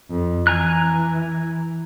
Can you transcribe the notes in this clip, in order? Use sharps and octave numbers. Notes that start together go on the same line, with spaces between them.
F2
E3 G#5 A#5 F#6